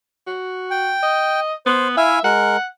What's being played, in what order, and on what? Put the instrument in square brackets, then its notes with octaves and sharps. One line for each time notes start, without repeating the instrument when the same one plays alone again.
[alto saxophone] F#4
[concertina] G5
[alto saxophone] D#5
[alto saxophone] B3 [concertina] C5
[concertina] E4 F5 G#5 [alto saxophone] E5
[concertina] G#3 A#4 [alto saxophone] F#5